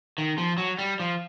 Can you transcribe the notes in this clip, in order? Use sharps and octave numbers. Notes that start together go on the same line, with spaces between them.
D#3
F3
F#3
G3
F3